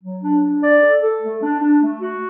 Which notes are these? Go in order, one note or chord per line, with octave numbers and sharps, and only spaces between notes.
F#3
D4
D4
D5
A4
A4
A3
D4
D4
A3
F#4